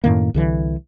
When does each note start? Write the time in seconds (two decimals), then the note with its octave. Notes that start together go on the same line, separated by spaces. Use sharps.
0.04 F#2 A2 D#3 A#3
0.34 C2 D3 E3